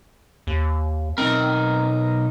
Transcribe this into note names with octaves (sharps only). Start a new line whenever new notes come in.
D#2
B1 C4 D#4 A#4